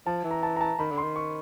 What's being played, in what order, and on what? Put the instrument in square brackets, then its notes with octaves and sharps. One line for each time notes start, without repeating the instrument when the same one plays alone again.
[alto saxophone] F3 [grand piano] A5
[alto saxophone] E3
[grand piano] A#5
A5
A#5
A5
[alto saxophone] D#3 [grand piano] B5
[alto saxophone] D3
[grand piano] C6
[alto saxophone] D#3
[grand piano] C#6